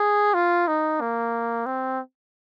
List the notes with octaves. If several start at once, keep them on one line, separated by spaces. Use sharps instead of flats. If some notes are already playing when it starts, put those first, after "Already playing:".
Already playing: G#4
F4
D#4
A#3
C4